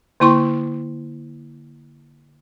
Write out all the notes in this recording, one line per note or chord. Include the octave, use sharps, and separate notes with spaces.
D3 A#3 E4 C6 C#6